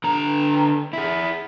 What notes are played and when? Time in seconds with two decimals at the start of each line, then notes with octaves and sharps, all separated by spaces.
0.04 D3 A#5
0.93 E4 G#4